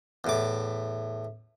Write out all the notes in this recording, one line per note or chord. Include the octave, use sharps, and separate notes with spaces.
E2 A2 D6